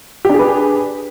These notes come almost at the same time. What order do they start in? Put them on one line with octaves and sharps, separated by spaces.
G4 D4 G#4 B4